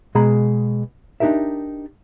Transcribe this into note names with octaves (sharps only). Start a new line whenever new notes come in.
B2 G#3 G#4 A#5 B5
D4 D#4 G4 A#4 E5